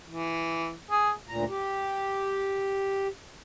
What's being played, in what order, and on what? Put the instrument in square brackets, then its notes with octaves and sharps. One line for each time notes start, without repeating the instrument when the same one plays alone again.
[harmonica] E3
G#4
[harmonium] D2 A#2 A#5
G4